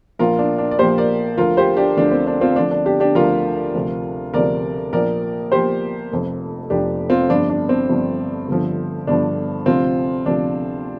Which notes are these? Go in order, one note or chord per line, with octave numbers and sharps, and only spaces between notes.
A#1 A#2 F3 F4 A#4
D4
D4
D5
A#1 A#2 F3 G4 C5
A#4 D5
D2 D3 F3 F4 A#4
G4 C5
D4 G4
D2 D3 F3 D4
C4
D4
C4 F4
D2 D3 F3 D4
D4
D4 G4
D4 G4
D2 D3 F3 F4 A#4
D2 C3 F3
D2 C3 F3 A#4 D5
A#1 A#2 F3 A#4 D5
A#1 A#2 F3 G4 C5
F1 F2 F3
F1 F2 F3 D4 G4
C4 F4
G1 G2 F3 D4
D4
C4
G1 G2 F3
G1 G2 D3 F3
G1 G2 D3 F3 D4
D2 C3 F3 C4 F4
D2 C3 F3 D4